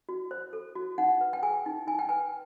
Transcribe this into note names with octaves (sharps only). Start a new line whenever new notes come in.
F#4
C5
A4
F#4
D#4 F#5
B4
G5
G#4 G#5
D#4
D#4 G#5
G5
B4 G#5